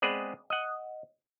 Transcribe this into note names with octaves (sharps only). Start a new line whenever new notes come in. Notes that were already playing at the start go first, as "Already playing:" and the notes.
G#3 B3 C4 G#4 B4 D5
D#5 F#5